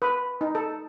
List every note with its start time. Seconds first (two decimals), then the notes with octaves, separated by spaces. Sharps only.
0.02 B4
0.41 D#4
0.55 A4